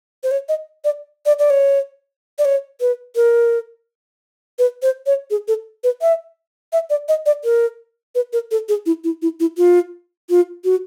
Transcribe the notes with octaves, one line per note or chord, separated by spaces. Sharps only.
C5
C#5
D#5
D5
D5
D5
C#5
D5
C#5
B4
A#4
B4
C5
C#5
G#4
A4
B4
E5
E5
D5
D#5
D5
A#4
B4
A#4
A4
G#4
E4
E4
E4
E4
F4
F4
F#4